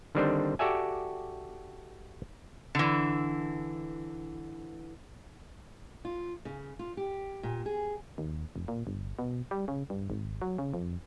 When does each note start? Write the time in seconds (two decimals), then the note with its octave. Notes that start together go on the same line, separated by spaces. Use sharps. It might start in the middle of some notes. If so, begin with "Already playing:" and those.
0.15 D3 D#3 G3 C4 D4 C5
0.59 F#4 G4 A4 D5 E5 G#5
2.75 D3 E3
6.05 F4
6.45 C#3
6.79 F4
6.97 G4
7.43 A#2
7.66 G#4
8.18 D#2
8.56 F1
8.68 A#2
8.87 G1
9.19 B2
9.51 G3
9.68 C#3
9.90 G2
10.10 G#1
10.42 F#3
10.58 C#3
10.74 F2